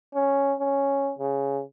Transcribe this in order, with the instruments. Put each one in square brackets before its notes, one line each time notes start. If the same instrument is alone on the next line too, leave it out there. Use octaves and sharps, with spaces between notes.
[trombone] C#4
C#4
C#3